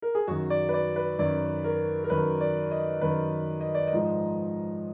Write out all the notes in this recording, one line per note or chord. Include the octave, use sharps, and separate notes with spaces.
A#4
G#4
F#2 D#3 F#4
D5
B4
D5
B4
F#2 D#3 D5
A#4
A#4
F#2 D#3 B4
D5
D#5
F#2 D#3 B4
D#5
D5
D#5
G#2 F3